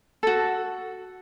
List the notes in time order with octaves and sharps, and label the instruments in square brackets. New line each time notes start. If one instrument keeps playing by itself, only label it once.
[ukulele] F#4 A4